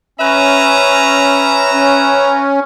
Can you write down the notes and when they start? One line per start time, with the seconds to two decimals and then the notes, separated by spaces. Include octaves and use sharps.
0.20 C#4 B4 E5 A#5
1.74 C#4